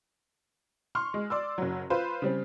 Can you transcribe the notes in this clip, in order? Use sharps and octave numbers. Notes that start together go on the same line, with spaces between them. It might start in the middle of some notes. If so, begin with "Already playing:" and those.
C6 C#6 F6
G#3
D5 C6 E6
F#1 F#3
F4 B4 C5
C#3 G3 C4